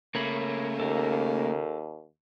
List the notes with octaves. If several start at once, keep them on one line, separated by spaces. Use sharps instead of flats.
C#3 A3 A#3 A#4 C#5 B5
D#2 A4 A#4